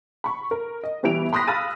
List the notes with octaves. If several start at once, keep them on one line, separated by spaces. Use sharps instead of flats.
B5 C#6
A#4
D#5
B2 E3 G3 E4 D7 F7
B5 C6 D#6 F#6 A#6 B6
F5 B5 E6 F6 A6 D#7